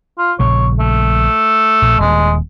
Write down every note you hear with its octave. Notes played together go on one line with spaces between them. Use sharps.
F4
A#1 C#3 C#5
A3
A#1
D#1 G#3